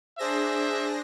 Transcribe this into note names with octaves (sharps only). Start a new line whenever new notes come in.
D4 G#4 C5 E5 A#6